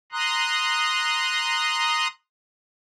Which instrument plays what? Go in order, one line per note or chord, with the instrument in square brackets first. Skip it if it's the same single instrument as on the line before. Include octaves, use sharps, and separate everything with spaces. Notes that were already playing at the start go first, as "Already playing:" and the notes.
[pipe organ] A#5 C6 D#6 F#6